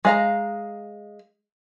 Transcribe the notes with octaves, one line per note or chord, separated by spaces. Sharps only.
G#3 F5 A#5